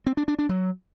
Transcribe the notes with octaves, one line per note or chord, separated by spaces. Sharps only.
C4
D4
D4
D4
F#3